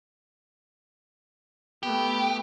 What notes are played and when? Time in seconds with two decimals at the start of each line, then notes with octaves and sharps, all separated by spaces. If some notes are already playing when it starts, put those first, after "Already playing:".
1.83 A3 B3 G4